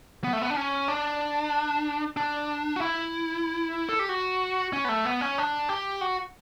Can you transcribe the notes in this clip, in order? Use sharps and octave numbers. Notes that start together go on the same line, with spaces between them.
B3
A3
B3
D4
C#4
D4
D4
F#4
E4
A4
G4
F#4
C#4
B3
A3
B3
C#4
D4
G4
F#4